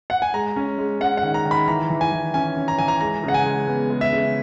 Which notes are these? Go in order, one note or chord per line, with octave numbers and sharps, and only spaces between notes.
F#5
G#5
G#3 A#5
C#4
G#3
C#4 F#5
F#5
D#3
A#5
D#3
B5
E3 A#5
E3
G#5
E3
C#4 G#5
C#4
A#5
E3 G#5
A#5
G#3 A#5
C#3 F#5
G#5
G#3
B3
G#3
E5
C#3